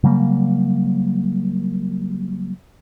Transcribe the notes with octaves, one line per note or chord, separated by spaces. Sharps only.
C#3 F#3 G3 A#3